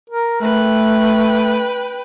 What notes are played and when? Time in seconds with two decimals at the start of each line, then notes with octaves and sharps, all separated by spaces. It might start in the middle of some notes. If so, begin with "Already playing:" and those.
0.10 A#4
0.41 A3 B4 G5